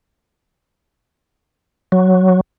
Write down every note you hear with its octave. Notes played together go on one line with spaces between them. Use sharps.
F#3